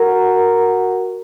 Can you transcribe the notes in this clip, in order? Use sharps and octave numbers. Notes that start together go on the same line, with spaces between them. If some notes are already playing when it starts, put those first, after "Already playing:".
Already playing: F#4 A#4